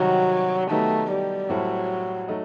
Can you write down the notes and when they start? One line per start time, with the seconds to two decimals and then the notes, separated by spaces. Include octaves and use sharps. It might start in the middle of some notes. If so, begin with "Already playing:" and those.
Already playing: C3 D#3 F#3 G3 D#4 F#4
0.70 D#3 F#3 A3 B3 D#4 G4
1.11 G3
1.49 A2 F#3 G3 C4 E4 A4
2.28 F#3 A3 D#4